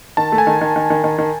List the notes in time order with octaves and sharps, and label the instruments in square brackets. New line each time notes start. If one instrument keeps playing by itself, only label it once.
[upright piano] D#3 [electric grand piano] A5
[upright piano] A3
[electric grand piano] G#5
[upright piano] D#3
D#3
D#3
D#3
D#3
D#3